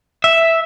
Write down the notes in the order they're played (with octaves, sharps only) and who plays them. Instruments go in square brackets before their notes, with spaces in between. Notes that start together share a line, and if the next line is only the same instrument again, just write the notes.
[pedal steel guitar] E5